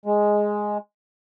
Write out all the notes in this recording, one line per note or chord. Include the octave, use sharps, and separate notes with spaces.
G#3